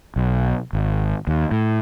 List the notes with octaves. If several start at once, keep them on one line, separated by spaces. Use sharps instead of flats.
B1
G#1
D#2
A2